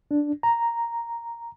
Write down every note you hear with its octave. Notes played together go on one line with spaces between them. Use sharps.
D4
A#5